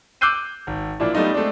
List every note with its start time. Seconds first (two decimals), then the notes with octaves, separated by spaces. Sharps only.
0.21 D6 E6 F#6 G6 C7 D#7
0.67 G#1
1.00 A#2 F3 D4 E4
1.14 G3 A3 B3 D#4 F4
1.34 G#3 A3 C4 D4